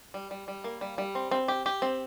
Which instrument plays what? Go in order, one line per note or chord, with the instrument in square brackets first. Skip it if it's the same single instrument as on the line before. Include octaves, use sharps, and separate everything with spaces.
[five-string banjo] G3
G3
G3
A#3
G3
G3
C4
C4
G4
G4
C4